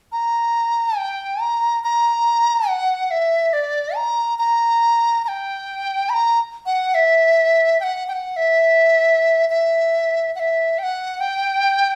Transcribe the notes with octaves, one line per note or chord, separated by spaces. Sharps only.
A#5
G5
A#5
A#5
F#5
E5
D5
A#5
A#5
A#5
G5
B5
A#5
F#5
E5
G5
F#5
G5
F#5
E5
E5
F#5
E5
G5
F#5
G5